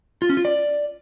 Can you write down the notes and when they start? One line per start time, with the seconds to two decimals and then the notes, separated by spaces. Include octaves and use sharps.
0.22 F4
0.29 C#4
0.37 F4
0.45 D5